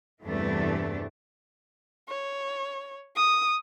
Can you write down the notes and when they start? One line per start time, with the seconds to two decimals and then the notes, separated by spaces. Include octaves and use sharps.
0.24 E2 G2 C3 E3 A3 D4
2.08 C#5
3.16 D#6